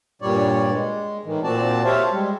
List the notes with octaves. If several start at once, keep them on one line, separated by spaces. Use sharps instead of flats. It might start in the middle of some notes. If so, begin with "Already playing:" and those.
G2 A#2 G3 C#5 D5
G#3
A2 D#3 E3
A#2 C4 F#4 D5 A5
G4 C5 C#5 E5 F5 A5
G3 G#3